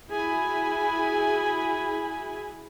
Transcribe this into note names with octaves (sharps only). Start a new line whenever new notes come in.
E4 F#4 G#4 G#5 B5